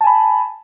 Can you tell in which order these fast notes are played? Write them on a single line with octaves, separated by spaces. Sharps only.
A5 G#5 B5